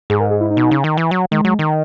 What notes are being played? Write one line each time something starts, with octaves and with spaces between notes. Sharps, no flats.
G#2 G#4
A#4
G#4
E4
D#4
B2
C#3
D#3
E3
F#3
D#3 G#3
F#3
D#3